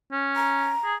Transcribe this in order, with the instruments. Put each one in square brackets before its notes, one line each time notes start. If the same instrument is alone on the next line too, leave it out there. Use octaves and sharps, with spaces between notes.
[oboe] C#4
[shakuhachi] A#5
[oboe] G#4